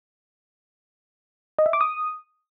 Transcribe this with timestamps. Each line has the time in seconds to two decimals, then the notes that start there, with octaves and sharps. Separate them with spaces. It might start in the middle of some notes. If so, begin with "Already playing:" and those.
1.59 D#5
1.66 E5
1.73 D6
1.81 D#6